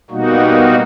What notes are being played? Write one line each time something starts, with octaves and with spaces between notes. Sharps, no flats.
B2 G3 A#3 D#4 F#4